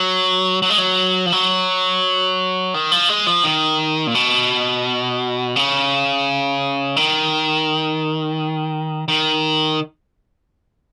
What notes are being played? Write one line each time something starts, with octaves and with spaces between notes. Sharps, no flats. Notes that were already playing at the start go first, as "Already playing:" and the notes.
Already playing: F#3
F#3
G#3
F#3
F3
F#3
D#3
F3
G#3
F3
D#3
A#2
B2
C#3
D#3
D#3